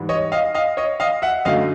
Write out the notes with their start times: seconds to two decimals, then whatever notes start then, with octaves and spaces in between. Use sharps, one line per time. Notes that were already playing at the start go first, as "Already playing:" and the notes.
Already playing: G#2 E3 G3
0.09 C#5 D#5
0.32 D#5 F5
0.55 D#5 F5
0.77 C#5 D#5
1.00 D#5 F5
1.22 E5 F#5
1.45 F#2 D3 F#3 A3 D#5 F5